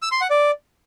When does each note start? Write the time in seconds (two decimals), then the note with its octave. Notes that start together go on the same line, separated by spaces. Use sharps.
0.02 E6
0.12 C6
0.21 F#5
0.30 D5